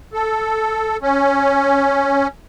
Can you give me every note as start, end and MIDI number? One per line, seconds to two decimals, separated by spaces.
0.13 0.97 69
1.02 2.27 61